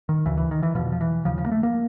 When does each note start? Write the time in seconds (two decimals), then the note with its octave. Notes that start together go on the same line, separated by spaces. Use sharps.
0.09 D#3
0.26 D2 C#3 E3
0.37 E3
0.51 D#3
0.63 E3
0.75 E2 B2 F3
0.92 F3
1.01 E3
1.25 D#2 C#3 F3
1.38 F3
1.46 A#3
1.51 A3
1.63 A#3